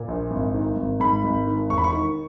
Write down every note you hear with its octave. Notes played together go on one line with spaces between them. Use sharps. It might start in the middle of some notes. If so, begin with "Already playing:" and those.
Already playing: A#2
A#1
G#1
D#3
G#1
G#2 B5
G#1
D#3
E1 C#6
B5
C#6
D#3